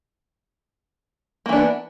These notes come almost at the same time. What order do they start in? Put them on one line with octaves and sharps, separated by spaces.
A#3 E3 D4 B3